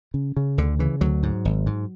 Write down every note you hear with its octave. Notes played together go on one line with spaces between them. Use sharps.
C#3
C#3
D2 D3
C#3 E3
D2 F#3
G#2
G#1
G#2